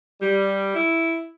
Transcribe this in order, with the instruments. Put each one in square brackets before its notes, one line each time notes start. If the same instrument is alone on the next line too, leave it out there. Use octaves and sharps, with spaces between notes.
[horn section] G3
E4